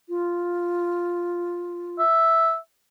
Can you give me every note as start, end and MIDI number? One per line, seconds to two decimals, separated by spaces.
0.09 2.00 65
1.99 2.57 76